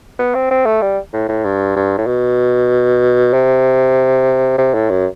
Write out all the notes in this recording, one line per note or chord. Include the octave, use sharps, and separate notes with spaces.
B3
C4
C4
A3
G3
A2
A2
G2
G2
A2
B2
C3
C3
A2
F#2